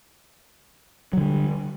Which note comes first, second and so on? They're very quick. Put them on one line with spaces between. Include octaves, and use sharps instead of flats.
F#3 D3 G3